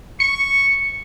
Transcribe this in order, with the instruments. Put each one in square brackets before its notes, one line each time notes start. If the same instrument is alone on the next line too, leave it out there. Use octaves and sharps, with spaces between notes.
[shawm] C#6 [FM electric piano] C#7